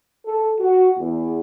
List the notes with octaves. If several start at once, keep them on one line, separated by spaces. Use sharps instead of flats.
A4
F#4
E2